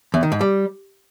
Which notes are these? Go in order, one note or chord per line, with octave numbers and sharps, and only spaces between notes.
E2
D#3
G#2
G3